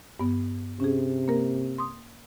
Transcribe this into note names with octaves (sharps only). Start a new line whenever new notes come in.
G2 B3
C3 C#4 G#4
A#3 A#4
C6 D#6